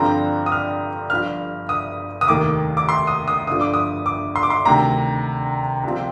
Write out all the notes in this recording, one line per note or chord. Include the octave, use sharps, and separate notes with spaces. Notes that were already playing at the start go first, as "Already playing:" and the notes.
Already playing: G2 D3 F3 C4 A#5
D#6
F6
G1 G2 F3 F6
D#6
D#6
F1 D#2 D#3 D6
D6
C6
D#6
D#6
G1 G2 D3 F3 D#6
D6
D#6
D6
C6
D6
C6
D2 C3 D#3 A#5
C2 C3 F3 C4